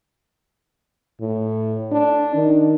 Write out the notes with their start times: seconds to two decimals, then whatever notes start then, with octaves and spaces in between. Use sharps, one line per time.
1.21 A2
1.92 D4
2.35 D#3